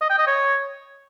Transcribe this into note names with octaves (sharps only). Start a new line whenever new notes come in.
D#5
G5
D#5
C#5